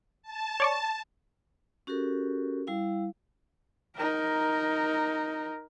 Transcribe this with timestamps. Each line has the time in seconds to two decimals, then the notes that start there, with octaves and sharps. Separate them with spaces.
0.23 A5
0.60 C#5 D5 C#6
1.87 C#4 F#4 G4 A4 A#4
2.67 G3 E4 F5
3.96 D#4 A#4